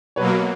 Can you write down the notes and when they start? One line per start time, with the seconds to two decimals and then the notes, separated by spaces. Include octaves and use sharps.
0.16 B2 F#3 A#3 B4 C#5